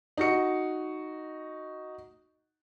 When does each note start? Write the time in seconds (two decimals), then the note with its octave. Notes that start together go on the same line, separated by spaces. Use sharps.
0.17 D#4 F#4 C#7